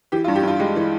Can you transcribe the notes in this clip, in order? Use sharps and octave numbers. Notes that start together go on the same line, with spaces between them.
E3 G4
F4
G2
G4
G2 F4
G#3 G4
E3